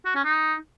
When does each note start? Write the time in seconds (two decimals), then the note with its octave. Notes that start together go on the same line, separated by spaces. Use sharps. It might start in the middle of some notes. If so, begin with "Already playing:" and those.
0.06 F#4
0.15 C#4
0.24 D#4